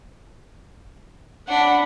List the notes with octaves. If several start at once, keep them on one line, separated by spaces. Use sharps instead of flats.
D4 F#5 B5